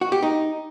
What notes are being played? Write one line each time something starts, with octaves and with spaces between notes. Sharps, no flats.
F#4
G4
D#4